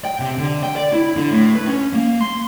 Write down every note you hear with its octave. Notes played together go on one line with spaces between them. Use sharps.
G5
C3
D3
G5
D5
E4
D3
A2
B4
C#4
A#3
C6